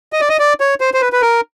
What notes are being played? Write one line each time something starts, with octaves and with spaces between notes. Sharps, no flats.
D#5
D5
D#5
D5
C#5
C5
C5
B4
B4
A#4